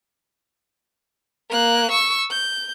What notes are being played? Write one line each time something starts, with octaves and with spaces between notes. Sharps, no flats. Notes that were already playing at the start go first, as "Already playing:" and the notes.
A#3 F#6
C#6 E6
G6